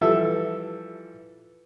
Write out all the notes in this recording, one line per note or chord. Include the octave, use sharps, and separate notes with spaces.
E3 F3 G3 A4 E5